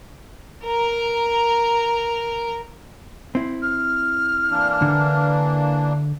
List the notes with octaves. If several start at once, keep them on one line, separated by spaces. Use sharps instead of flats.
A#4 A#5
C4 E4
F6
E3 A#3 D4
D3